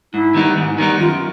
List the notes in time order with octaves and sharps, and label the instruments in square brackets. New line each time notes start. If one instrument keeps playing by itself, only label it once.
[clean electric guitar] G#2 [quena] E4
[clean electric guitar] D#3 G3 B3 D#4
G#2
D#3 G3 B3 D#4
[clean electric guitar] F#2 [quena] F4